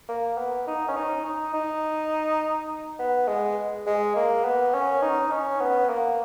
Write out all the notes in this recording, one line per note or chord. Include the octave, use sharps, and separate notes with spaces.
A#3
B3
D#4
C#4
D#4
D#4
D#4
B3
G#3
G#3
A#3
B3
C#4
D#4
C#4
B3
A#3